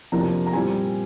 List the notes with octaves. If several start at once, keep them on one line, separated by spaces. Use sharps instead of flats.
F2 C3 F3 A#3 D4 A#5
A#5
A#2 G3 C4 G#5